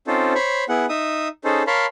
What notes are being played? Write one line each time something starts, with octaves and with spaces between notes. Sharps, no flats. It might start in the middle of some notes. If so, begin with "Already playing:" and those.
C4 C#4 D#4 F4 A4 C5
C5 C#5 B5 C#6
B3 E4 G#4 F#5
D#4 E5 D#6
C#4 D#4 G#4 A4 C5
A#4 C#5 F5 A5 B5 C6